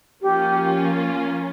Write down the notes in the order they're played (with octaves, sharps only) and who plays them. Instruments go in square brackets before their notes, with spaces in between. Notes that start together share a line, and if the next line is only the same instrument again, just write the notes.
[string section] F3 A#3 C#4 F4 [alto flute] G4